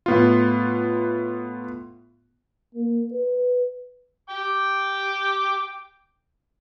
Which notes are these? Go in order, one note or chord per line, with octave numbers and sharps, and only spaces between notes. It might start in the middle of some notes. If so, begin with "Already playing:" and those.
A2 B3 F4
A#3
B4
G5 D6